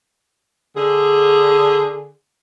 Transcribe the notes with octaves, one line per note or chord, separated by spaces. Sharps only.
D3 G#4